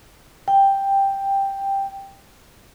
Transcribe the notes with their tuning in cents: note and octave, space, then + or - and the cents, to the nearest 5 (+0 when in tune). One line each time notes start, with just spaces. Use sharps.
G5 +5